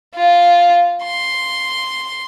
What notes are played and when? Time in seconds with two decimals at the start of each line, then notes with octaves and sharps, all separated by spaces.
0.15 F4
1.04 C6